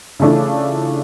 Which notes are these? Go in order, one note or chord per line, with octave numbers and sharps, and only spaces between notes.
C#3 E3 A3 D4 F4